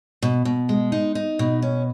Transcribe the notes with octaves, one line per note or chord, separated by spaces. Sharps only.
B2
B2
G#3
D#4
D#4
B2
C#4